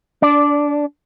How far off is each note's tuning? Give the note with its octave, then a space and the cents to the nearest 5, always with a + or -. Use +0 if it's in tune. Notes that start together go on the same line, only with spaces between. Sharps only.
D4 -20 D5 +0